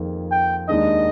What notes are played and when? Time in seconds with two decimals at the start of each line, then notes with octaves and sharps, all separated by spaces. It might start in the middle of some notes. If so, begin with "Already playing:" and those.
Already playing: F2 D#3 A#3 F4 G#4
0.31 G5
0.69 D#2 D#3 G#3 D4 D#5